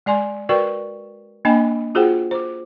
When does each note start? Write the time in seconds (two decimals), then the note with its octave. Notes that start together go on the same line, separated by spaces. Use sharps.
0.06 G#3 D5 G#5 C6
0.49 F#4 A#4 B4 D5 G5 C#6
1.45 A#3 D4 D#5 G5 G#5 B5
1.95 F4 F#4 G#4 C5 F#5 G5
2.31 C5 D6